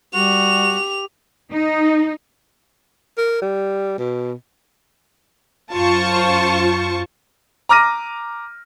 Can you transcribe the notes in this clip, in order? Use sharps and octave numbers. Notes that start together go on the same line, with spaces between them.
G3 F#4 G4 F7
D#4
A#4
G3
B2
F#2 F4 C5 A5 C#6
A#5 D6 F6 A#6 D#7